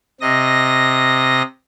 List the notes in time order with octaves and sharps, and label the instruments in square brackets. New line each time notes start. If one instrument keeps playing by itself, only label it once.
[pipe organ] C3 D#5 A#6